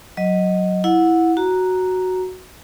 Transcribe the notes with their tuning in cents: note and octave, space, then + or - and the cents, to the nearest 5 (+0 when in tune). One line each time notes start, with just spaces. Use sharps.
F#3 +0 D#5 +0
E4 +0 F#5 -20
F#4 +0 A#5 +0